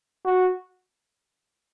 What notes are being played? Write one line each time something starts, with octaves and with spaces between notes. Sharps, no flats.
F#4